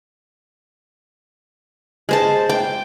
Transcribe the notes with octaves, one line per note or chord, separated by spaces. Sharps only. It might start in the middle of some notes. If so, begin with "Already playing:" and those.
G#3 C5 A5
G5